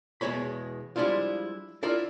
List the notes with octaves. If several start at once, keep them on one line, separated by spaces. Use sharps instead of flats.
E2 B2 G#3 C#5 B5
F3 G3 G#3 D4 E4 F4
D4 E4 F4 A#4 D5